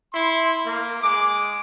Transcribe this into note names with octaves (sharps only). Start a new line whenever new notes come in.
E4 C6
A#3
G#3 D6